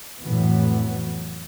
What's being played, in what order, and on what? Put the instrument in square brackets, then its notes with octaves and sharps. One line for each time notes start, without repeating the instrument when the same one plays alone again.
[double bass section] F2 A2 E3 F#3 B3